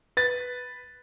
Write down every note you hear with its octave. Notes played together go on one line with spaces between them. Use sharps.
B4 A6